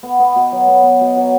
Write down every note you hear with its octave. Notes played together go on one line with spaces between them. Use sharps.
B3
B3
B2
F#3
B3
B3
B2
F#3